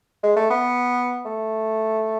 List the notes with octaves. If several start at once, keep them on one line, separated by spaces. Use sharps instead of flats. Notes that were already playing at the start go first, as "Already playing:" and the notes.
G#3
A3
B3
A3